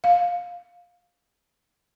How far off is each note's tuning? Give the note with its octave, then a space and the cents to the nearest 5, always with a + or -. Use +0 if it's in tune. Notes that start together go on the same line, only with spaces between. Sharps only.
F5 +15